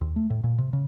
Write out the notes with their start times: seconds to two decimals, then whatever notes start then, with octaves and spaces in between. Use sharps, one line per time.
0.01 D#2
0.16 A3
0.30 A2
0.44 A#2
0.58 C3
0.73 C#3